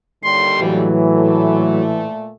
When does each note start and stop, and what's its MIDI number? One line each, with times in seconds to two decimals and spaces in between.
0.23 0.96 39
0.23 0.96 50
0.23 0.96 55
0.23 0.60 84
0.60 2.14 45
0.60 2.06 52
0.60 1.81 54
1.12 2.29 46
1.12 2.29 57